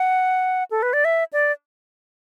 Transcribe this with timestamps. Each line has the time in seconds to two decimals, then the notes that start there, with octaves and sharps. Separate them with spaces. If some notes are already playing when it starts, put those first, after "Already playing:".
Already playing: F#5
0.71 A4
0.83 B4
0.93 D5
1.05 E5
1.33 D5